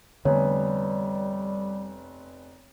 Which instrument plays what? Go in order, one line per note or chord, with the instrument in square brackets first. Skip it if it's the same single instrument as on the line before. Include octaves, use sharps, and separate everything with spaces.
[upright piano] F1 B3 G#5 [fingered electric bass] D3 [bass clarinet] G3 [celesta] C#5